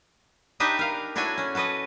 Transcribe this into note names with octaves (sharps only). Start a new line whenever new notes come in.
D4 D#4 G4 B4 D#5 E5
A#4 F5
D4 E4 F#4 A4 C#5 G#5
C#4
F#4 A4 B4 D#5